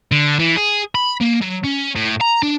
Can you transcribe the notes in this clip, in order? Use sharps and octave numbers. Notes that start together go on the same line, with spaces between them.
D3
E3
G#4
B5
A#3
F#3
C#4
A2
A#5
D4